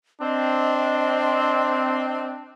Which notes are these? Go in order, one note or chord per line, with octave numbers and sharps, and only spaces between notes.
C4 D4 D#5